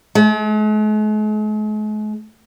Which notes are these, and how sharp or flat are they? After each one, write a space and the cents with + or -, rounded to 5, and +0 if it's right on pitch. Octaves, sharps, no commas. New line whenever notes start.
G#3 +45